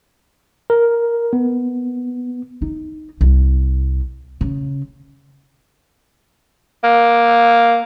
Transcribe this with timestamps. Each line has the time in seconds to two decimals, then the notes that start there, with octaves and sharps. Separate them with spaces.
0.70 A#4
1.33 B3
2.62 D#4
3.21 C2
4.41 C#3
6.84 A#3